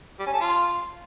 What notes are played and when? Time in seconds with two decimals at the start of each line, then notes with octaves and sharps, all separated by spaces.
0.20 G3
0.27 C#4
0.34 A4
0.40 F4